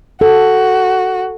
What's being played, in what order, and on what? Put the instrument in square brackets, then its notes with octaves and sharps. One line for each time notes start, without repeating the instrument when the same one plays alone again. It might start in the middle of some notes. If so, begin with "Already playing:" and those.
[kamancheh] F#4 [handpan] A4